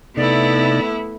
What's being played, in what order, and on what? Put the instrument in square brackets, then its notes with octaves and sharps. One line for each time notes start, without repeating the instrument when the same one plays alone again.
[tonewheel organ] C3 D#4 [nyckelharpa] A3 [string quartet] B3 E4 [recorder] D5